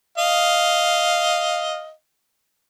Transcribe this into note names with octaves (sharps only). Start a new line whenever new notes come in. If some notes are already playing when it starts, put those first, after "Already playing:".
D#5 F5